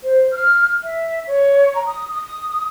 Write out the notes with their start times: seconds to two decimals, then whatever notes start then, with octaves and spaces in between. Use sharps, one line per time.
0.03 C5
0.31 F6
0.83 E5
1.26 C#5
1.75 A#5
1.86 D#6
2.11 D#6